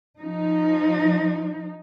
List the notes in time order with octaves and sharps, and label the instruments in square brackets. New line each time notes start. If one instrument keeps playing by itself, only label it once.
[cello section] F3 D#4